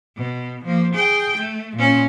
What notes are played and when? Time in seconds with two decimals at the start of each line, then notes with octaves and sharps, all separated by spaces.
0.17 B2
0.65 F3 A#3
0.94 G#4 G5
1.37 A3
1.76 A#2 C#4